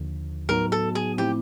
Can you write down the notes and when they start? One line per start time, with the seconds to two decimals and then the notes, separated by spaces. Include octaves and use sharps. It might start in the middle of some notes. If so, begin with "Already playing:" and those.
Already playing: D#2 D3 F3
0.49 A2 F#3 B3 D#4 F#4 A#4
0.72 A4
0.95 G#4
1.17 A2 F3 A3 C4 E4 G4